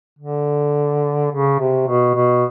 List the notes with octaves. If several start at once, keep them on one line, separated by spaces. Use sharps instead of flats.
D3
C#3
C3
B2
B2